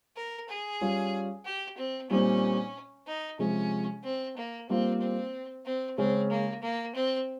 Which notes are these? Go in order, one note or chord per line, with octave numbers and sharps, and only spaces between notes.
A#4
G#4
G3 C#4 F4
G4
C4
A#2 G3 C4 C#4 D#4
D#4
C3 F3 G#3 C#4
C4
A#3
G3 A#3 C4 F4
C4
C4
C#3 G#3 C4 C#4
A#3
A#3
C4